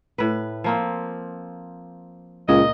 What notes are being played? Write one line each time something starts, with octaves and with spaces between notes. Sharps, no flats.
A2 B4
F3 A#3 C4
C#2 A#2 D#5